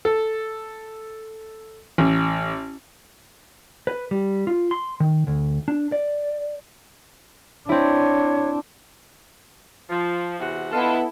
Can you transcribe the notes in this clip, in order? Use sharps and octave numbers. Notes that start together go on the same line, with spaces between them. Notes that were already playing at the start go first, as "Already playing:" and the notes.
A4
A1
B4
G3
F4
C6
D#3
D2
D4
D5
C4 D4 E4 C#5
F3
E2 C3 F#4
B3 D4 E4 F4 A4 D#5